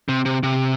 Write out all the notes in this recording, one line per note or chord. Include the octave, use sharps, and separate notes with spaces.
C3
C3
C3